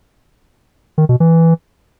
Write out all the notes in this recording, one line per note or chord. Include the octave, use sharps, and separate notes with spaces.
D#3
B2
E3